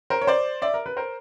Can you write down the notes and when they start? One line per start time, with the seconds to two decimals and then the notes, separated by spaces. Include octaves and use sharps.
0.10 A#4 C5
0.21 C#5
0.27 C5 D5
0.62 D5 E5
0.74 A#4
0.86 B4
0.97 A#4 C5